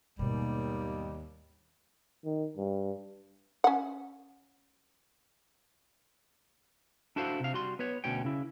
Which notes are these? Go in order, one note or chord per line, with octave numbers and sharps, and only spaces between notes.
D#2 G#2 B2 G3
D#3
G2
C#4 F#5
D4 E4 F#4 A4 C5 F5
C3 F5
G3 F#4 C6
B3 B4 C#5
D2 B2 C#4 G5
C#3 E4